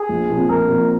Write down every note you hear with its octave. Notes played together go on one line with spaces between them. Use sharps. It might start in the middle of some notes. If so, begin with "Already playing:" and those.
Already playing: G#4
A#1
A#2 F3 C4
A#1 A#4
A#2 F3 C4